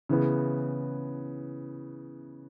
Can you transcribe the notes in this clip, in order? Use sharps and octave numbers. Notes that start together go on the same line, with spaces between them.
C#3 E3 B3